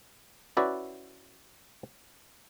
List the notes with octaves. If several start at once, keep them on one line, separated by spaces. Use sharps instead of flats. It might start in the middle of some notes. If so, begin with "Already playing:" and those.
C#4 E4 F#4 B4 D5